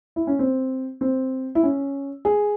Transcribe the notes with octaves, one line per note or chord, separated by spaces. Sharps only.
E4
C#4
C4
C4
E4
C#4
G#4